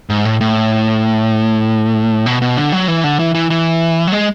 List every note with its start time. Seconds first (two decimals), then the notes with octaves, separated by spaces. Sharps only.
0.09 G#2
0.25 A2
0.41 A2
2.26 B2
2.42 B2
2.57 D3
2.72 F#3
2.88 E3
3.04 D3
3.19 E3
3.34 E3
3.50 E3
4.07 F#3
4.12 G#3